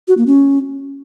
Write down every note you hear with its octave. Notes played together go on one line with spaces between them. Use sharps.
F#4
A#3
C#4